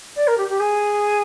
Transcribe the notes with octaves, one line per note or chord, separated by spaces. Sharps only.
D5
A#4
G4
G4
G#4